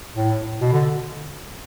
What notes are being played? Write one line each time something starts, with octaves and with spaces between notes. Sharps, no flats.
A2
B2
D3